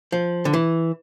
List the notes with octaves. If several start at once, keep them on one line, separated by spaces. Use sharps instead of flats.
F3
D3
E3